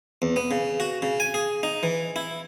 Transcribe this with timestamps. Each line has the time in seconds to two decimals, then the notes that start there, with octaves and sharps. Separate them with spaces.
0.22 E2
0.36 B3
0.51 C#3
0.80 F#4
1.02 C#3
1.20 G#5
1.34 G#4
1.63 D#4
1.83 E3
2.16 E4